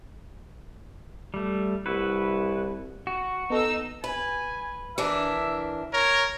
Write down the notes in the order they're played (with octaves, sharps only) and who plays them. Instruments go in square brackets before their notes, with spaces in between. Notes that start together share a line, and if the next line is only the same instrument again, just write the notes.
[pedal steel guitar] G3 A3
[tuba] C2 [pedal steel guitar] E4 F#4 B4
[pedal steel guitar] F#4
[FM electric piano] B3 A4 [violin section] D#4 E6
[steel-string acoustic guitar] B4 [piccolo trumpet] G#5
[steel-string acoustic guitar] E3 D4 A#4 [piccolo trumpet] E5
[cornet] A#4 [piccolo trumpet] C#5